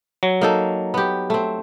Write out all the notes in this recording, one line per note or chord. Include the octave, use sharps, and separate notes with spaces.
F#3
A#3 D#4 A4
B3 G4
A3 C4